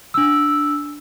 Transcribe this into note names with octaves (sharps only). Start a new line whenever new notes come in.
D4 E6